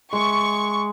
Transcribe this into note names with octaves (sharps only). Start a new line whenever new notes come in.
G#3 E5 C#6